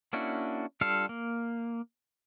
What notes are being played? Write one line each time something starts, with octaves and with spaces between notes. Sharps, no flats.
A#3 C#4 D4 E4 F#4
G3 D4 F4 A4 F5
A#3